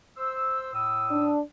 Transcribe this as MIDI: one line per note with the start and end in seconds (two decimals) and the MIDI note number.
0.17 0.73 72
0.17 0.73 88
0.73 1.30 45
0.73 1.30 87
0.73 1.30 88
1.11 1.40 62